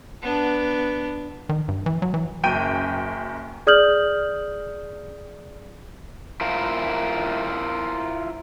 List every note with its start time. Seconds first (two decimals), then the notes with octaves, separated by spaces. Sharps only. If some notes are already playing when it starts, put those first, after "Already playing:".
0.22 B3 D4
1.49 D#3
1.68 G2
1.86 E3
2.02 F#3
2.14 E3
2.44 F#1 F#2 G5 D#7
3.67 G#4 D5 D#6 F6 G6 F#7
6.41 E4 F4 A#4 C5